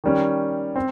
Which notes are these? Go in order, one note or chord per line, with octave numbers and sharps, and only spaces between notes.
D#3 G3 C#4
C4